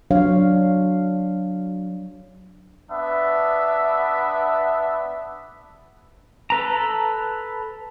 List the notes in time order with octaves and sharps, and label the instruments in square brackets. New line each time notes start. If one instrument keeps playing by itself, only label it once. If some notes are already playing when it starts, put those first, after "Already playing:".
[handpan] F#3 D4 C#5 F5
[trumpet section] B3 D4 E5
[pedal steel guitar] A4 B4 A#5